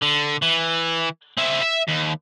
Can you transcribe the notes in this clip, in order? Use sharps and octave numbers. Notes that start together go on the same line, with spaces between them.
D3
E3
C4 E4
E5
D#2